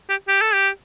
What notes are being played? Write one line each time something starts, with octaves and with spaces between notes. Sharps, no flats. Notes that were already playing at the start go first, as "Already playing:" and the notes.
G4
G4
A4
G4